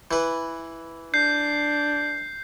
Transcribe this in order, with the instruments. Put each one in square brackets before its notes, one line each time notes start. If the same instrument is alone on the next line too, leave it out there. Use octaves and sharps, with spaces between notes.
[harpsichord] E3 B4
[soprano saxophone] D4 [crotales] G6 C7